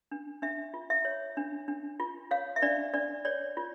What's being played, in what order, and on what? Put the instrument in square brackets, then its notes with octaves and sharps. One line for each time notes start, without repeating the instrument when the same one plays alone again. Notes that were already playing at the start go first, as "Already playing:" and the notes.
[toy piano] D4
D4 E5
F4
E5
C#5
D4
D4
F4
C#5 F5
E5
D4 D5
D4 D5
C#5 D5
F4